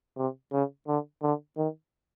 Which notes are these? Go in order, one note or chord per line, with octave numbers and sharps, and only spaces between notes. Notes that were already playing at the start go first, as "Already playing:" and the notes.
C3
C#3
D3
D3
D#3